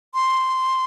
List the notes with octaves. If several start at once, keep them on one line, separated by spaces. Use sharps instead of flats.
C6